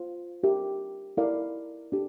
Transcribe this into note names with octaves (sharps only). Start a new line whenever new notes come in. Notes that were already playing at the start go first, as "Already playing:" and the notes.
Already playing: F4 C5
D4 G4 A#4 E5 G5
E4 A#4 D5 F5
D4 G4